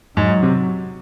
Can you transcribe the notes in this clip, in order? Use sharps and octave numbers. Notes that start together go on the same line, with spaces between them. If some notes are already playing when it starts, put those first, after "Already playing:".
G#2 F#3
C3